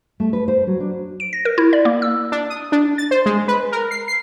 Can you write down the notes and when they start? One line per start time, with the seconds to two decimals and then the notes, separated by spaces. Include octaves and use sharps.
0.20 A3
0.33 B4
0.48 C5
0.67 F#3
0.80 D4
1.20 D7
1.33 A#6
1.45 A#4
1.58 E4
1.73 D5
1.85 A#3
2.02 E6
2.32 D4
2.50 D#6
2.72 D4
2.98 A6
3.11 C5
3.26 G#3
3.48 B4
3.72 A#4
3.91 C7
4.08 C7